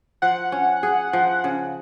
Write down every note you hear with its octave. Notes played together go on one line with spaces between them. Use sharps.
F3 F#5
C#4
G#4
F3
C#3